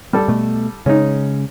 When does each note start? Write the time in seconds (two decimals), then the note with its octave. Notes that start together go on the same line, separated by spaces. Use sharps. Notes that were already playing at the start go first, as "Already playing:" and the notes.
0.13 G3 A4
0.28 B2 A3
0.86 C#3 G#3 C#4 D#4